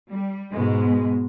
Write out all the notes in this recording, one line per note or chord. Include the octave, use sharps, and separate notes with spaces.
G3
G#2 B2 G#3